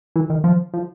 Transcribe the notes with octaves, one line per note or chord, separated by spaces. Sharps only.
E3
D#3
F3
F3